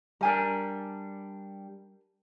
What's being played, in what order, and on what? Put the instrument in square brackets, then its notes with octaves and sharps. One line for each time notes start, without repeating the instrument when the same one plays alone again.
[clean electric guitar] G3 D4 [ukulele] A#4 G#5 A#5